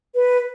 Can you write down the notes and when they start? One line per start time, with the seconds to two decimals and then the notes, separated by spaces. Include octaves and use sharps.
0.15 B4